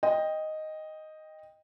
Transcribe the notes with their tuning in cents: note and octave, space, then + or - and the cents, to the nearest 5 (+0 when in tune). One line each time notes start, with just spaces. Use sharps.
D#5 +0 G5 +15